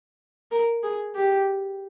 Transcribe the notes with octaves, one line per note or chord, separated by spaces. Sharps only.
A#4
G#4
G4